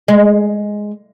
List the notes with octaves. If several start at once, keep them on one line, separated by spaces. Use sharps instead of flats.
G#3